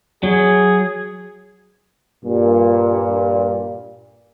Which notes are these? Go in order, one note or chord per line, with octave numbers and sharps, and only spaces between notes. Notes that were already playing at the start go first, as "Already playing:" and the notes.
F#3 G#4
G2 A#2